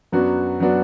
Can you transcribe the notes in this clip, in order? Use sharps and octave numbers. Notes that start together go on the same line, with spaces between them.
F#2 F#3 B3 D4 F#4
F#3 B3 D4 F#4